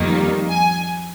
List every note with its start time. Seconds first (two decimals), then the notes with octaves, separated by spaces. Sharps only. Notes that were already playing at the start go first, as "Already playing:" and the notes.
Already playing: F2 D#3 G3 A#3 D#4
0.51 G#5